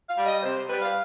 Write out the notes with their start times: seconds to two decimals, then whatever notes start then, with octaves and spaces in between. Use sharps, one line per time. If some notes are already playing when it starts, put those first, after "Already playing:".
0.08 F5
0.17 G3
0.26 D#5
0.43 C3 C5
0.56 C5
0.68 G3 B4
0.82 F5